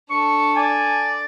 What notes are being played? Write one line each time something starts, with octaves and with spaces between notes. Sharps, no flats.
D4 A4 C#6
D5 G#5